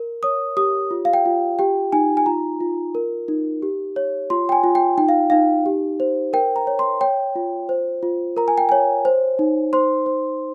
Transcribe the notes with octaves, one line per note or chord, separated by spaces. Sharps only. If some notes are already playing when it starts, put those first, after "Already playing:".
Already playing: A#4
C#5 D#6
G4 D#6
F4
F5
G5
F4
G4 G5
D#4 G#5
G#5
F4 A#5
F4
A#4
D#4
G4
C#5
F4 C6
G5
G#5
F4
G5
D#4 G5
F5
D#4 F5
G4
C5
A#4 G5
A#5
C#5
C6
C#5 G5
F4
C5
F4
A#4 A#5
G#5
G5
C#5 G#5
C5
D#4
C5 C6
C5